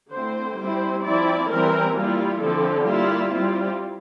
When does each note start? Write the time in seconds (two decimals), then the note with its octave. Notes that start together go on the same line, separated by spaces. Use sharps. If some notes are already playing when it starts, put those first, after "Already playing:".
0.12 D3 A3 C4 E4 C5
0.58 G3 C4 E4 C5
1.04 F3 C4 E4 D5
1.49 E3 G3 C4 E4 A#4
1.94 G3 A#3 E4 F4
2.40 D3 F3 C4 E4 A4
2.85 G3 A#3 E4 F4
3.31 G3 C4 E4 F4